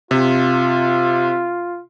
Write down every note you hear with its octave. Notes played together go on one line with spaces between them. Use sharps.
C3 F4